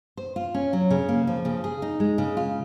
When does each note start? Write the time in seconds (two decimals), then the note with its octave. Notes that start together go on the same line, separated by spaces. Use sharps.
0.17 C5
0.36 F4
0.54 C#4
0.73 F#3
0.91 C#3
1.09 A#3
1.27 F3
1.45 C#3
1.64 G#4
1.82 D#4
2.00 G#3
2.18 C#3
2.37 F4